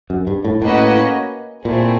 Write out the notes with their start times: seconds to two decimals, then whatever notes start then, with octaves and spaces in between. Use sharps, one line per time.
0.10 F#2
0.27 G2
0.45 A2
0.62 A2 A#3 C#4 F#4 B4 D#5
1.65 A#2 A3 C4 E4 G#4